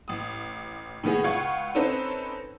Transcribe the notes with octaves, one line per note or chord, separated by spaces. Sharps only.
A1 D#6
A2 D#3 B3 G#4
C#2 F4 F5 F#5 C#6 G#6
C4 C#4 D#4 A4 B4 C5